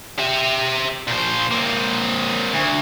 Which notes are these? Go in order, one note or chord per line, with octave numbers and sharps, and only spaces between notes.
G4 E5
A#2 C5
A#3 C4
D2